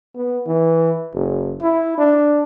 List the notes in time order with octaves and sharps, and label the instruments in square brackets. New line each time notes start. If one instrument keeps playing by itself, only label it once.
[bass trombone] B3
E3
F#1
E4
D4